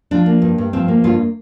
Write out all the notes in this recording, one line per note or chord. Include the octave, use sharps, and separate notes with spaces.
F3 D4
A#3
G2
G2
F3 C4
A#3
G2 F4